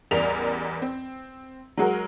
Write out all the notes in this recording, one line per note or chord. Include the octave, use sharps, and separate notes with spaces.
A1 E2 G3 A#4 B6 F7
C4
F#3 G#3 F#4 A#4